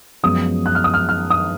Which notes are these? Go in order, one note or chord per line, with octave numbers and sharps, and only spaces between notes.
F#2 F3 G#3 B3 D#6
F#6
F6
D#6
F6
F6
D#6